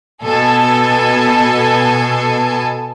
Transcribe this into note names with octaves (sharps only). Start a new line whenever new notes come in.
B2 A4 G#5